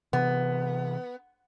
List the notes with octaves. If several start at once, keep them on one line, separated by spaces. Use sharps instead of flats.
C3 E3 B3